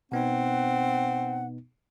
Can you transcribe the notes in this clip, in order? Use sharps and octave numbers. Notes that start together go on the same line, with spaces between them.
B2 B3 C4 D#4 F#5